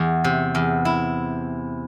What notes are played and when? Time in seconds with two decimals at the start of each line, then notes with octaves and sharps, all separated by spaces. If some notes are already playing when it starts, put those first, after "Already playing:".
Already playing: E2
0.24 C3
0.55 E2
0.85 E4